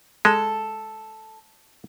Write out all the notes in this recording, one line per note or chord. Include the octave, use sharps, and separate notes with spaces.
G#3 A4